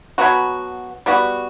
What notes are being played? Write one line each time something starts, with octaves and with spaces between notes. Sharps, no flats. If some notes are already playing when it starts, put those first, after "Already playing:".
B2 F#3 B3 F#4
G3 B3 F#4